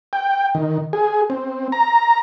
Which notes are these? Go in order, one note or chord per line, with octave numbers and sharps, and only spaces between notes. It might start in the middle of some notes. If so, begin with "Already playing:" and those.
G5
D#3
G#4
C4
A#5